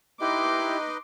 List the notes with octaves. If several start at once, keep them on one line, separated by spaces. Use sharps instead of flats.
D#4 E4 G4 B4 D#5 C6 D6